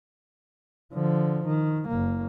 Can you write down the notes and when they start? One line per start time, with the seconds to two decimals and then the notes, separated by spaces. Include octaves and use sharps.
0.93 D3 F3
1.45 D#3
1.88 F#1 A#3